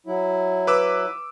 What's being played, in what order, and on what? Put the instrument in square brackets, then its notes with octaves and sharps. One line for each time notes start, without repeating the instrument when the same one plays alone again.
[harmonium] F#3 E4
[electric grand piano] B4 D6 E6